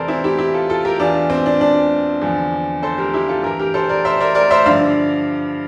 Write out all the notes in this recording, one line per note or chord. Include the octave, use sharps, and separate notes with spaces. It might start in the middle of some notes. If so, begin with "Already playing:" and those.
Already playing: E2 C3 E3 A4 A#4 C5 D5
C4 E4
E4 G4
E4 G4
F4 A4
F4 A4
G4 A#4
E2 E3 D4 F4
C4
D4
D4
E2 D3 F3
A4 C5
G4 A#4
E4 G4
F4 A4
G2 E3 G4 A#4
G4 A#4
A4 C5
A#4 D5
C5 E5
A#4 D5
A#4 D5
C5 E5
G2 D3 F3 D5 F5